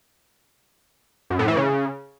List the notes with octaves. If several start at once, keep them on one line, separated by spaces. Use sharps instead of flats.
F#2
A2
E3
C#3